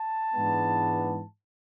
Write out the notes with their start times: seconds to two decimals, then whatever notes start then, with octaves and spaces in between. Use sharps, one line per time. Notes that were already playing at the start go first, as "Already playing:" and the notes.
Already playing: A5
0.33 G#2 E3 G#3 B3 D4